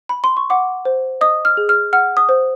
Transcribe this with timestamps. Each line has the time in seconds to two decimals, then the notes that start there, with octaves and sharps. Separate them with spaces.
0.09 B5
0.24 C6
0.37 C#6
0.50 F#5 D6
0.85 C5
1.21 D#5 D#6
1.45 F6
1.57 G#4
1.69 F6
1.93 F#5 F6
2.17 D#6
2.29 C5